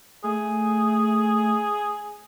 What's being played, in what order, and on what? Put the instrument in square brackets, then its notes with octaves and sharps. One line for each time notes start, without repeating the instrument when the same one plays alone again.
[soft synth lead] A3 [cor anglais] G#4